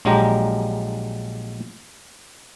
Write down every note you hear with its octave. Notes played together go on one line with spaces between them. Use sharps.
A#1 F#3 G#3 D4 G4 A#5